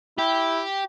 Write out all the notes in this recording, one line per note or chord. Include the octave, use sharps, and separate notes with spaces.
E4 G4